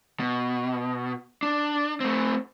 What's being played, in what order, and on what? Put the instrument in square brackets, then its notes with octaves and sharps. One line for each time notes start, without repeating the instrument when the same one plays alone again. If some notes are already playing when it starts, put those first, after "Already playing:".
[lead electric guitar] B2
D4
A3 C4